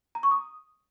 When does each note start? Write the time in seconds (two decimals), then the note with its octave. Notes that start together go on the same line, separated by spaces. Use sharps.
0.15 A#5
0.23 C#6
0.31 D#6